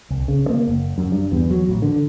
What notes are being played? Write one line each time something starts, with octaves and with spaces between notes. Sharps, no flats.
C2
C#3
A#3
F#1
F#2
G2
E2
F#3
A1
D3